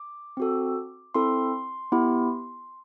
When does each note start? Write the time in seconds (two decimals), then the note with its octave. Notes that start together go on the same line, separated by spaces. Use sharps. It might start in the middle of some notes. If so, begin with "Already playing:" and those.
Already playing: D6
0.37 C4 F#4 A4
1.14 C4 E4 A4 C6
1.92 B3 E4 G4